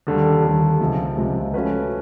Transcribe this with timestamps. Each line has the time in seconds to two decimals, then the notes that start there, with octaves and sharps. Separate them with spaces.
0.07 D#2 D3 G3
0.43 D#2 D3 G3
0.80 C#2 C3 F3 G#3
1.17 C#2 C3 F3 G#3
1.54 F3 A3 C#4 F#4 B4